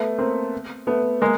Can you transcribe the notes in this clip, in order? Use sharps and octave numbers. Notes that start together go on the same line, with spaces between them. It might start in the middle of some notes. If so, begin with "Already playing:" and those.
Already playing: A3 B3
A#3 C4
A3 B3
G#3 A#3